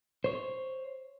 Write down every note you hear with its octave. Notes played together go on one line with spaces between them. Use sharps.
C5 C#5